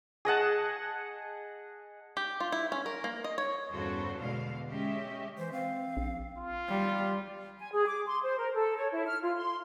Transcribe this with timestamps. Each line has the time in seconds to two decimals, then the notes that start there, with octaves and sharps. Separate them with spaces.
0.25 G#4 D#5 F#5 A5
2.17 G4
2.40 F4
2.52 E4
2.72 C#4
2.86 A#4
3.04 A#3
3.24 D#5
3.38 C#5
3.71 E2 G2 C#3 F#4 A4 C5
4.21 B2 D3 G#3 F5
4.70 G#3 C#4 G4 D#5 E5
5.38 E3 C5
5.52 C4 F5
5.97 A#1
6.37 F4
6.69 G3
7.60 G#5
7.72 G#4
7.87 D6
8.06 C6
8.22 C5
8.37 A#4
8.54 A4
8.76 C#5
8.92 E4
9.07 F6
9.22 F4
9.36 C6